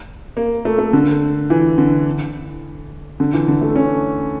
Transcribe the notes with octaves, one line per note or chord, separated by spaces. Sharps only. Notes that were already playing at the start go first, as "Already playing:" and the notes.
A#3
A3
A3
D3
E3
D3
D3
E3
D3
A3
C#4